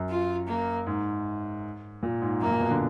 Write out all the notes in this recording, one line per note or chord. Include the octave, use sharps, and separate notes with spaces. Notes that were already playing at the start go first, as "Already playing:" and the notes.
Already playing: F#2
F4
A#3
G#2
A#2
G#2
F#2 A#3
A#2
B2
D3